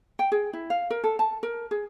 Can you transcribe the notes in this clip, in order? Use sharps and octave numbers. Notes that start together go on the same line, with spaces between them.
G5
G#4
E4
F5
A#4
A4
A5
A#4
G#4